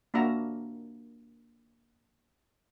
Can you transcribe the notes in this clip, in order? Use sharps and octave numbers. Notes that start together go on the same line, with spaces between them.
A#3 D4 F#4 E5 A#5